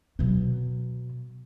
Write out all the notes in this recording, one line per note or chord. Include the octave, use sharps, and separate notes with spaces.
B2 F#3